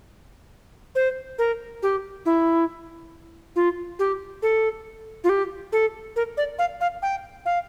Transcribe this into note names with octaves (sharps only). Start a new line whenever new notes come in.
C5
A#4
G4
E4
F4
G4
A4
F4
G4
A4
A#4
D5
F5
F5
G5
F5